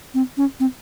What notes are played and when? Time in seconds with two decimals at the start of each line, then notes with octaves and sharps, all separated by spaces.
0.14 C4
0.37 C#4
0.60 C4